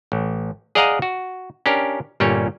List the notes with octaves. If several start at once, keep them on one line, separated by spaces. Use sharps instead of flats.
A1
G#4 D5 D#5 F5 F#5 A#5
F#4
C#4 D4 G4 A#4
G1 A#2 G3 C#4 C#5